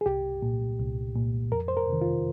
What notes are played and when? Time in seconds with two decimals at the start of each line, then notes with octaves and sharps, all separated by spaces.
0.01 G#4
0.06 C2 G4
0.42 A#2
0.79 C2
1.16 A#2
1.52 F2 A#4
1.68 C5
1.77 A#4
1.89 C3 D#3
2.01 F4